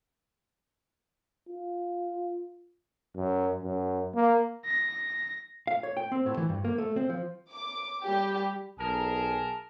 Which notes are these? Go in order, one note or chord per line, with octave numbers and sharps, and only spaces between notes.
F4
F#2
F#2
A#3
A#6
F5
C#5
G5
C4
A2
E3
G2
A#3
A3
C4
F3
D6
G3 G4
B1 G#4 A#4 A5